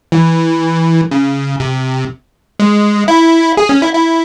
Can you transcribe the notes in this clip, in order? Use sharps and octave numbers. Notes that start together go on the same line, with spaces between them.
E3
C#3
C3
G#3
E4
G#4
C#4
E4
E4